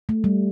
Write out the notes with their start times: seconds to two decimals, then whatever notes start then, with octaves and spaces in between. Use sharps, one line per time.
0.09 A3
0.24 G3